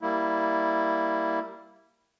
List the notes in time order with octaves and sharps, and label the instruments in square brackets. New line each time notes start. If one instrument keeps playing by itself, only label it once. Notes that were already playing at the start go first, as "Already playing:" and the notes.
[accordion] G3 A#3 E4